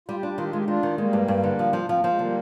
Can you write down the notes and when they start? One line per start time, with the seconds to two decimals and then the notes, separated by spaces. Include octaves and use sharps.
0.08 G3 F4
0.15 G4
0.22 D4 F4
0.30 G4
0.37 D#3 F4
0.43 G4
0.50 F4
0.53 G#3 G4
0.64 D#3 D4 F4
0.83 D#3
0.98 G3 G#3 A#3
1.13 G2
1.28 G2
1.43 D3
1.59 F3
1.73 F3
1.89 F3 C4
1.98 A#3
2.04 F3 G#3
2.17 D3 G3 A#3